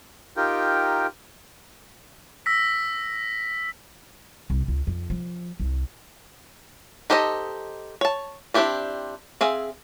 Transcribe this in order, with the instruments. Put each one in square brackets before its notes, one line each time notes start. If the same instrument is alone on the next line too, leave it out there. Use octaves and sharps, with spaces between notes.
[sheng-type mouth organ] D#4 F4 G4 A#4 G5
[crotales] E6 A#6 B6
[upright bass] C2
C#2
F2
F3
C2
[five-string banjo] D#4 G4 A4 C5 D#5
C#5 A5
C4 D4 E4 G4 D5
C4 G#4 E5 F5